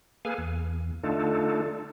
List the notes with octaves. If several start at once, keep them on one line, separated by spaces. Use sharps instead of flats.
A#3 G#4 A4 B4 F5 G#5
E2
D3 A3 D4 D#4 F4 A4